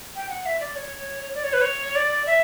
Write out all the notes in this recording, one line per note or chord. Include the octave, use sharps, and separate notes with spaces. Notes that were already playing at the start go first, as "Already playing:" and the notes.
G5
F#5
E5
D5
C#5
D5
C#5
B4
C#5
D5
E5